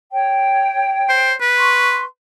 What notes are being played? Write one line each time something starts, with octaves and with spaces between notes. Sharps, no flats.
C#5 G5
C5
B4
C6 C#6